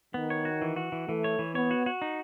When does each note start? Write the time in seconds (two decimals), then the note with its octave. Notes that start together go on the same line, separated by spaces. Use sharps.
0.14 D#3 B3
0.30 C#5
0.45 F#4
0.62 E3
0.76 F#4
0.92 E3
1.08 E3 A3
1.24 C#5
1.39 E3
1.55 B3 C#5
1.71 F#4
1.86 F#4
2.02 D#4